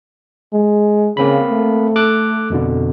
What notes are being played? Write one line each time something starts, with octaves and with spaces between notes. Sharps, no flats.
G#3
C#3 A#3 C4 B5
A3
A4 D6 F#6
F2 B2 D3